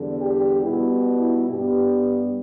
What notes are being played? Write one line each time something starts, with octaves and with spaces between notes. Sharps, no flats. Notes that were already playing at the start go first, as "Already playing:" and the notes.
Already playing: E2 D3 G3
G4
B2 G3 B3 E4
E4
G2 G3 B3 G4